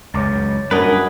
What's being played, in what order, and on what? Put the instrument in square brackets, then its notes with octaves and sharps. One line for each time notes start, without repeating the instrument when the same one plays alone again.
[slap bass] C#2 F#2 [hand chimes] C#5 D6 A6
[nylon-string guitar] F#2 A#4 D#5 [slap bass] G3 C#4 D4 [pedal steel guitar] G#4 B4